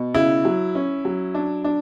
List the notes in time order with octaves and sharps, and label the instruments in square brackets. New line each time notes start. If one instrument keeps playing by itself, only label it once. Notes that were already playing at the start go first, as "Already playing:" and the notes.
Already playing: [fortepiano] B2
[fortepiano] C#3 [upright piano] E4
[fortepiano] F#3
C#4
F#3
D4
D4